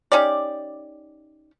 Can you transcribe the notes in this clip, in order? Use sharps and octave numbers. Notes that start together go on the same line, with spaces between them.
C#4 D#4 G4 D5